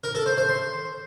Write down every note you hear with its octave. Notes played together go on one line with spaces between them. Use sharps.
A#4
A4
C5
C5
C6